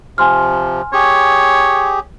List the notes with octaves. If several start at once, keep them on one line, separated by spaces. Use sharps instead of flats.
C3 F3 G#5 C6 F6
G4 G#4 C#5